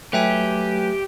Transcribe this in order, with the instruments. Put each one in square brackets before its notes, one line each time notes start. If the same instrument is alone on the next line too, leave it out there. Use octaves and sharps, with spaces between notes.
[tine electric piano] F#3 A3 [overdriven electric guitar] G4 [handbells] B4 E5 G#5